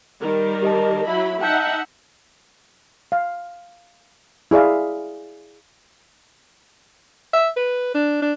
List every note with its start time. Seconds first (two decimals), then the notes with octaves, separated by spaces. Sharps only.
0.20 D#3 G3 A#4
0.63 G4 D#5 A5
1.08 F#3 E4 E5 B5
1.41 D#4 E5 F#5 G5 A5 G6
3.12 F5
4.51 E4 G#4 D5 E5 F5
7.33 E5
7.56 B4
7.94 D4
8.22 D4